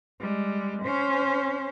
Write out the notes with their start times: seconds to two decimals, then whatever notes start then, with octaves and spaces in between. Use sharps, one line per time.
0.21 G3 G#3
0.83 C#4 C5